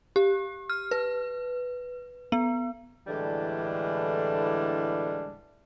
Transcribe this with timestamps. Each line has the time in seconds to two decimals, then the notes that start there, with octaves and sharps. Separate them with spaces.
0.16 G4
0.70 F6
0.91 B4
2.32 B3
3.07 A2 D3 E3 G3 G#3 D4